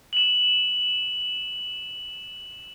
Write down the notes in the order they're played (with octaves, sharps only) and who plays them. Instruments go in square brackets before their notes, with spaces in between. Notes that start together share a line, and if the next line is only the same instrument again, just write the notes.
[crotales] E7 F#7